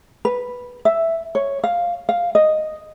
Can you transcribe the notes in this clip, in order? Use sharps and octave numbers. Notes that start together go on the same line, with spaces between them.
B4
E5
C#5
F5
F5
D#5